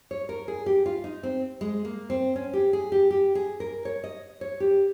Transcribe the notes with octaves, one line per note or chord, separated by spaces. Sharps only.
C#5
A#4
G#4
G4
F4
D#4
C4
G#3
A#3
C4
C#4
G4
G#4
G4
G4
G#4
A#4
C#5
D#5
C#5
G4